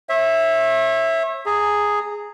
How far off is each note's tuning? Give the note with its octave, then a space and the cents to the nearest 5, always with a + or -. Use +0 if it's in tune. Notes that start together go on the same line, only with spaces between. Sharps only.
C#5 -40 E5 +0
G#4 +0 A#5 -25